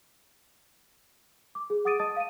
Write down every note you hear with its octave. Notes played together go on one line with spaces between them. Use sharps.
D6
G#4
F#5 D6 D#6 A6 D7 D#7
D#5 A5 D#6 A6
F5 D#7